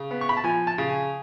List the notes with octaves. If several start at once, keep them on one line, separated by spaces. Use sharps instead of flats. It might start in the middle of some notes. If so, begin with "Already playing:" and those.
Already playing: C#3
B3
C#6
B5
A5
F3 G#5
A5
C#3
G#5